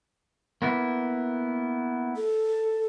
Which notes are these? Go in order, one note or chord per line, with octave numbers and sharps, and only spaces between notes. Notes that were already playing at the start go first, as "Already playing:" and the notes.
A#3 B3 E4
A4